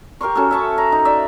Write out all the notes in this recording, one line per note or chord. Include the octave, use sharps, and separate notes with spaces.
G4 A#4 C6 C#6
C#4 F#4 A4
E5 A5 C#6
A#5
D#4
D5 E5